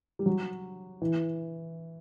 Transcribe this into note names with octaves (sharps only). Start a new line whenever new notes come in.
G3
F#3
E3